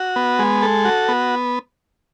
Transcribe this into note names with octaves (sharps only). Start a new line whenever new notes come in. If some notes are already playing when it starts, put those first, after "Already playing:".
Already playing: F#4
B3
G#3
A4
F#4
B3